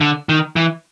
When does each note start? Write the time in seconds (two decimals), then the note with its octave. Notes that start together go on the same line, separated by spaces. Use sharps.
0.01 D3
0.29 D#3
0.56 E3